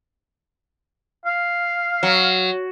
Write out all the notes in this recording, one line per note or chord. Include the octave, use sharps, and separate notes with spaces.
F5
F#3